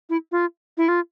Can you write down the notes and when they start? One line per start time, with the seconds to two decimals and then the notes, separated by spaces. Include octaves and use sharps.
0.10 E4
0.32 F4
0.77 E4
0.88 F4